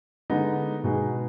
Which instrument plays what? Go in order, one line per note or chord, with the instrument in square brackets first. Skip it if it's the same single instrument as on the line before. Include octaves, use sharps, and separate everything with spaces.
[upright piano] D3 G#3 B3 D#4
B2 G#3 D#4 G#4 B4